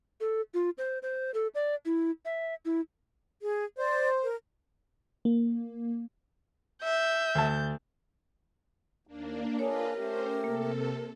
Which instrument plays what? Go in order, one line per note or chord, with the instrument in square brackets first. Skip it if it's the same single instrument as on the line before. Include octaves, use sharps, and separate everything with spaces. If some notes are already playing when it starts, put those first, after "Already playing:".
[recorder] A4
F4
C5
C5
A4
D5
E4
E5
E4
[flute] G#4
[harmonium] C5 [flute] D5
[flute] A#4
[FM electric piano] A#3
[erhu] E5 [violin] G6
[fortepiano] D2 A5
[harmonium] D#2 [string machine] A#3 D4
[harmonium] A#3 D4 G#4 [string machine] F4 B4 D#5 [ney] A#4 [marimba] C#5
[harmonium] A3 G4 [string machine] C#4 C5
[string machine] C3 A4 [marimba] A#3